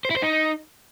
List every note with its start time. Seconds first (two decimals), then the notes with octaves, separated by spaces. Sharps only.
0.05 C5
0.11 E4
0.16 C5
0.22 D#4